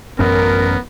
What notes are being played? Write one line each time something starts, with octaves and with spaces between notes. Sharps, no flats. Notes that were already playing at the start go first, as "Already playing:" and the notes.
A1 F#2 B3 C#4 A#4